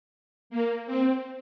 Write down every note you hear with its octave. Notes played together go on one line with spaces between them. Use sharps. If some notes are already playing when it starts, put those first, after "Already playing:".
A#3
C4